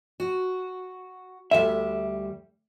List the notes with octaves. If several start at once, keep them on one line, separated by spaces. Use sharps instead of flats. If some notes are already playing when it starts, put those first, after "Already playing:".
F#4
D2 G3 E5